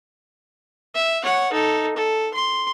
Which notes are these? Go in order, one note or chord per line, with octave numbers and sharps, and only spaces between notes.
E5
C#5 F#5
D#4 A4
A4
C6